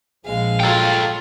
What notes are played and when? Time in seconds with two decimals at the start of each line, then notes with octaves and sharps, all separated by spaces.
0.25 A#1 G#3 F5
0.60 F#3 F4 A4 G5